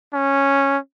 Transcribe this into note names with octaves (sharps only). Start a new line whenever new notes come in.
C#4